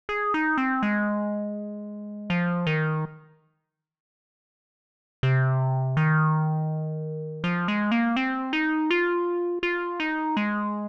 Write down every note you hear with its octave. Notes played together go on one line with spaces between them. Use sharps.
G#4
D#4
C4
G#3
F3
D#3
C3
D#3
F3
G#3
A#3
C4
D#4
F4
F4
D#4
G#3